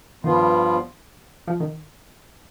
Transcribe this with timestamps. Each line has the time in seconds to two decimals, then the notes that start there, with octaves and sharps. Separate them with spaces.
0.24 G2 D#3 F3 B3 F4
1.47 F3
1.60 D#3